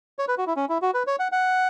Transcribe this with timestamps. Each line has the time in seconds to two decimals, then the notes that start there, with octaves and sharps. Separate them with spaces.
0.19 C#5
0.28 B4
0.38 F#4
0.47 E4
0.57 C#4
0.69 E4
0.82 F#4
0.94 B4
1.07 C#5
1.19 F#5
1.32 F#5